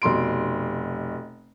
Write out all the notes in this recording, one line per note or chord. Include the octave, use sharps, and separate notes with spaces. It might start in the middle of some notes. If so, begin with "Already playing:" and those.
F1 B2 C6 D7